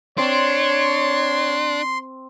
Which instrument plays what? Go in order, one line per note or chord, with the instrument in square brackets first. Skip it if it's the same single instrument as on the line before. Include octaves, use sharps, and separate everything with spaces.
[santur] C4 [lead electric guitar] D4 [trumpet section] C#5 [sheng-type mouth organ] C6